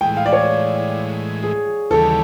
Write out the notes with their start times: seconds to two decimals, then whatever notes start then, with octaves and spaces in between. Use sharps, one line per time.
0.01 A2 E3 G#3 G5
0.17 F5
0.26 D5
0.33 C#5
1.43 G#4
1.90 D#2 C#3 E3 G3 A4